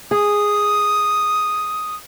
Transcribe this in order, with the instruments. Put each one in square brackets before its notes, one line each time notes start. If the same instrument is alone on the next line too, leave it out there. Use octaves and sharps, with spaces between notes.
[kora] G#4 [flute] D#6